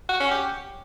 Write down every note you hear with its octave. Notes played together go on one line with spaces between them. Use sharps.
F#4
C#4
G4